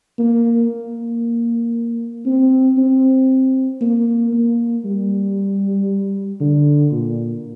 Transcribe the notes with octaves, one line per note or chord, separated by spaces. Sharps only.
A#3
A#3
C4
C4
A#3
A#3
G3
D3
A#2